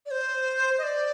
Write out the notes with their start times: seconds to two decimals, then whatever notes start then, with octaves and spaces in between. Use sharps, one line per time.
0.06 D5
0.11 C5
0.78 D#5
0.83 D5